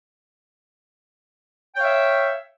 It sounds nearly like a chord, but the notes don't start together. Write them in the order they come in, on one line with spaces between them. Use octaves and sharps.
G5 C#5 F5 E5